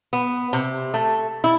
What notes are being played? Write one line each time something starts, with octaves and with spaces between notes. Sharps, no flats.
B3
C3
A3
E4